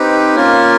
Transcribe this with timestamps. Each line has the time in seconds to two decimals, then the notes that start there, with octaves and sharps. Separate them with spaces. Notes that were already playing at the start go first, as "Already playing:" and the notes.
Already playing: C4 D#4 G4 B4
0.35 A#3 C#4 F4 A#4